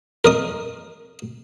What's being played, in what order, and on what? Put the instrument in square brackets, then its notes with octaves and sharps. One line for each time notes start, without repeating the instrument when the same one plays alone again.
[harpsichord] A#4 D#5 D#6